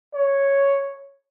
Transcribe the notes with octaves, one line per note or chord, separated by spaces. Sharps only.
C#5